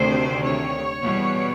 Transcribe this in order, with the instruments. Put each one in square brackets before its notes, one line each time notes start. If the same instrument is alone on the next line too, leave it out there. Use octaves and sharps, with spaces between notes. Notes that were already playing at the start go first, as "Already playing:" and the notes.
Already playing: [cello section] D2 C3 D#3 C5
C#5
E2 B2 G3 B3